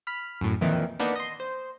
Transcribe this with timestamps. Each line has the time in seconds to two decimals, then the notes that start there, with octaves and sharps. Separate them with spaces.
0.07 B5 F6
0.41 F#2 A2
0.61 F2 A#2 D#3 E3
0.99 A#3 B3 D4 D#4
1.16 D#5 C6
1.40 C5